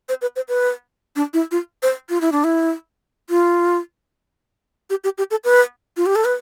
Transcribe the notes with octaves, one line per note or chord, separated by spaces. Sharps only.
C5
B4
C5
B4
D4
E4
F4
C5
F4
E4
D4
E4
F4
G4
G4
G4
A4
B4
F4
G4
A4
B4